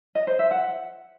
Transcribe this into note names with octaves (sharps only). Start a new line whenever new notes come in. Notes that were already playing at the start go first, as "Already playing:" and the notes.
D#5
C5
E5
F#5